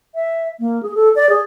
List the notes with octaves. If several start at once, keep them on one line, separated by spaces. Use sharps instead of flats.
E5
A#3
G#4
A4
D5
G#4